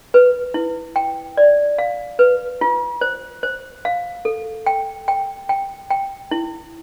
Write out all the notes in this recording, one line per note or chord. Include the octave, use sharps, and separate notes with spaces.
B4
E4
G5
D5
F5
B4
F4
C5
C5
F5
A4
G5
G5
G5
G5
E4